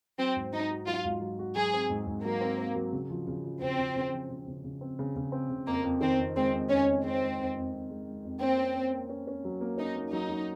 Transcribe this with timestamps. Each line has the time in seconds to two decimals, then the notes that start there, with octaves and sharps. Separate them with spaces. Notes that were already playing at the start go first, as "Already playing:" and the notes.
0.18 F#3 C4
0.36 G#2
0.53 F#3 D#4
0.70 F#4
0.87 F#3 F4
1.05 G#2
1.21 F#3
1.39 F#4
1.56 F#3 G#4
1.73 C4
1.90 G#2
2.07 G#2
2.24 F#3 A#3
2.41 C4
2.58 C4
2.75 F#3
2.92 C#3
3.10 F3
3.27 C#3
3.45 F3
3.61 C#3 C4
3.79 C#3
3.96 C#3
4.13 F3
4.30 C#3
4.48 C#3
4.64 C#3
4.81 C4
4.99 C#3
5.16 C#3
5.32 C4
5.50 C#3
5.67 F2 A#3
5.84 F2
6.01 D#3 C4
6.18 F2
6.35 G#3 C4
6.52 F2
6.70 F2 C#4
6.87 F2
7.04 G#3 C4
7.21 G#3
7.39 F2
7.55 F2
7.73 F2
7.90 G#3
8.07 G#3
8.24 F2
8.41 A#3 C4
8.58 C#4
8.75 A#3
8.93 A#3
9.09 C#4
9.27 C#4
9.44 F#3
9.61 A#3
9.78 C#4 D#4
9.95 A#3
10.12 F#3 D#4
10.29 F#3